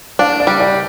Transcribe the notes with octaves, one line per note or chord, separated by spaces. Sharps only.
D4 F5
D5
G3
D5